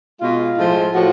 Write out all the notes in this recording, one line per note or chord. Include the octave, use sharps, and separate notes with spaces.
B2 G#3 F4
A2 F3 G#3
A2 F3 F#4